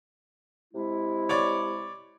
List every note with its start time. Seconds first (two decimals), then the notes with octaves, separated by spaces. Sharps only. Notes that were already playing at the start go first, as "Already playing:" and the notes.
0.74 C3 G#3 E4
1.29 C#5 D5 D6